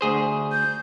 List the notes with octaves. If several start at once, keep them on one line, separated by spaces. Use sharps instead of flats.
D2 G#4 C5
G6